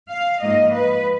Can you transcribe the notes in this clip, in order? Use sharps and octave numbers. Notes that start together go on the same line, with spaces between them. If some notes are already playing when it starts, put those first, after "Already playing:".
F5
G#2 F3 A#3 D#5
B4